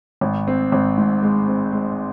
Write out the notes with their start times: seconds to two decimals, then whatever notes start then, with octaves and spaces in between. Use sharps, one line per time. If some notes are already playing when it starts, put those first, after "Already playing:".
0.21 G#1
0.47 C4
0.72 G#1
0.97 G#2
1.22 G#3
1.48 C4
1.72 G#3